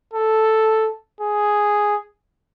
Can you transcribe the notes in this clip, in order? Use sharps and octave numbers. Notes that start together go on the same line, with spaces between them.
A4
G#4